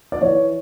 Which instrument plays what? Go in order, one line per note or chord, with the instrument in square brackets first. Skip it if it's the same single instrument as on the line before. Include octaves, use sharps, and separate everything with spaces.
[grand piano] D5
E3 C#5